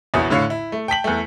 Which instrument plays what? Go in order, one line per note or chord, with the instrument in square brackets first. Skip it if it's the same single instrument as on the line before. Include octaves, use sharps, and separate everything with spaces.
[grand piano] A#1 E2 E4 F#4 C#5 D#6
A2 D3 C#5 F5
E4
A3
G5 A5 B6 F#7
E2 A3